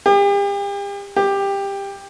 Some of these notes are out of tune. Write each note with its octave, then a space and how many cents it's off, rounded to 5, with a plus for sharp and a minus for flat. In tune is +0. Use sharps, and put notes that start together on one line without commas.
G4 +40
G4 +15